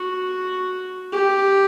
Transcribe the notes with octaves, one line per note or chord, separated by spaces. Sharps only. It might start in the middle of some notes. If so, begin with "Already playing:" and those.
Already playing: F#4
G4